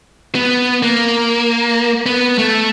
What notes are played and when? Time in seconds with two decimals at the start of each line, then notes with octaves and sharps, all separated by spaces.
0.35 B3
0.83 A#3
2.06 B3
2.38 A3